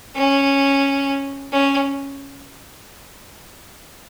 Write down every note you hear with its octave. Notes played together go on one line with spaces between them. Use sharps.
C#4
C#4